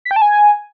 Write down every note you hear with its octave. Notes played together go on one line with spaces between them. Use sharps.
B6
G5
A5
G#5